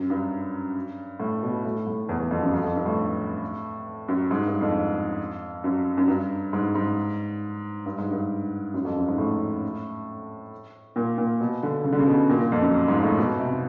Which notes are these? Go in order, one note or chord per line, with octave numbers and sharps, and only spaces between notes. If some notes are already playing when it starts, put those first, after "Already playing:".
Already playing: F#2
G2
A2
B2
A2
A2
E2
E2
F2
F#2
F2
F2
G2
A2
F#2
G#2
G2
F2
F#2
F#2
G2
G#2
G#2
G2
G#2
G2
F#2
F2
F#2
G#2
A2
A#2
A#2
B2
D3
C#3
D3
C#3
B2
A#2
A#2
F2
F#2
G#2
A2
B2
C3